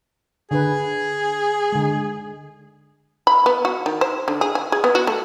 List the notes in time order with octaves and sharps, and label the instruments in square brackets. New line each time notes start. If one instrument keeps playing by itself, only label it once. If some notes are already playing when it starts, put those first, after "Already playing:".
[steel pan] D3 D4 B4 [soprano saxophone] G#4
[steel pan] D3 G#3
[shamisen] B5
B3
F#4
D#3
C5
D3
G#4
G#5
G#4
B3
F#4
A3